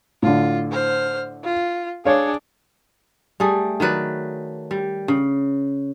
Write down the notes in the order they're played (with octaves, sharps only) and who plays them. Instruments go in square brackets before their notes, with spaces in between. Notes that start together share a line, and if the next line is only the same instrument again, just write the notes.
[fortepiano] A2 D3 [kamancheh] F4
[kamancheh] C5 F6
F4
[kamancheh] D4 G#4 [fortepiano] C#5 F5
[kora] G3 A3 G#4
D#3 F#3 B4 D5
G3
C#3